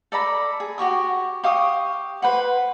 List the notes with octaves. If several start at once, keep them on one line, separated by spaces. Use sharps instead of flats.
A4 D5 A#5 B5
G#4
F#4 G4 C#6 D#6
G4 F5 C#6 D#6
B4 C5 F#5